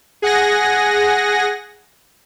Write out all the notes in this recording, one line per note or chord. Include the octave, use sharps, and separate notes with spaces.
G#4 F#5 G#5 A#6